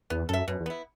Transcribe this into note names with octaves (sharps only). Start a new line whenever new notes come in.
E2 B3
F#2 A4 E5
F#2 B2
E2
B3 E4